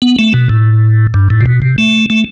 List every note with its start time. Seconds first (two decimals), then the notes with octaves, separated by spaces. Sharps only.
0.02 B3
0.19 A3
0.34 B2
0.49 A2
1.14 G2
1.30 A2
1.41 C3
1.46 B2
1.62 C3
1.78 A3
2.10 A3